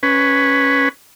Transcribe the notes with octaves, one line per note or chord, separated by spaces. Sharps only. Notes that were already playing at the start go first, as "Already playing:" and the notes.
C#4 B4